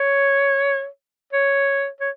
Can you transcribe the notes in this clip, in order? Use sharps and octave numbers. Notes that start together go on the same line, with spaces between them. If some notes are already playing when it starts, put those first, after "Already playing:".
Already playing: C#5
C#5
C#5